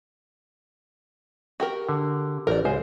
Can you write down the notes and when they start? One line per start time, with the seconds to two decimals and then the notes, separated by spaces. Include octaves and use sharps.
1.60 F#4 G4 A#4
1.89 D3
2.47 A1 A#4 D5
2.65 C#2 G#3 C5